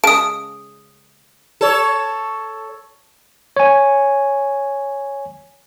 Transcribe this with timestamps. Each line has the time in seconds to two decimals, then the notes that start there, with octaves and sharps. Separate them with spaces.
0.04 C#3 G#3 A5 D#6 D7
1.61 A4 C#5
3.57 C#5 G#5